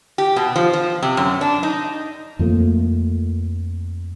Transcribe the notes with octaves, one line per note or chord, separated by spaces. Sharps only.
G4
B2
F3
F3
C3
F#2
D4
D#4
F2 F3 A3 A#3